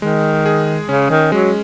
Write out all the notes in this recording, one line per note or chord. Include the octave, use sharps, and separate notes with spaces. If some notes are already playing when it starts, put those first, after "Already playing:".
D#3 G#3
G#4
C#3 C#4
D#3
F#3 G#3